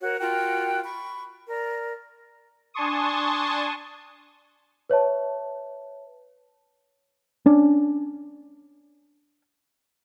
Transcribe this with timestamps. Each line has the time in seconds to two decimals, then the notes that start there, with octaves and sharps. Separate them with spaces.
0.01 F#4 A#4 C#5
0.20 F4 F#4 A#4 G5
0.84 B5 C#6
1.47 A#4 D5
2.74 D4 G#5 A5 C6 C#6 D#6
4.90 B4 C#5 E5 A5
7.46 C#4 D4